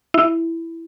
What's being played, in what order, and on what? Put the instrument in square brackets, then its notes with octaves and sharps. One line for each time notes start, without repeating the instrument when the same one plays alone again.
[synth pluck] E4